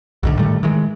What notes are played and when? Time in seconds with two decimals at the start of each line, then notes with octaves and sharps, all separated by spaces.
0.23 B1 G#2 D3
0.39 A2 D#3 G3 A3
0.63 D#3 E3 G#3